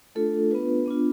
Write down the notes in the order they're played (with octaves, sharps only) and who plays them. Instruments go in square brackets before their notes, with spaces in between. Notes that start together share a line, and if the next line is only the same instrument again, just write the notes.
[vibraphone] A3 D4 F4 A4
B3 D4 F4 B4
B3 D4 F4